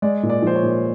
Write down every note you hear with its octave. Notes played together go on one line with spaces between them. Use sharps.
G#3 D5
A#2
D5
F3 C5
C#5
A#2